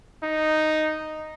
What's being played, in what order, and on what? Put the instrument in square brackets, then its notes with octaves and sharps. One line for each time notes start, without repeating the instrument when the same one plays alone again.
[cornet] D#4